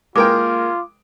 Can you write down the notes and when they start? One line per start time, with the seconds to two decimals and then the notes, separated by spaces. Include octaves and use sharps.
0.16 G#3 A#3 F4 A#4 G5 D6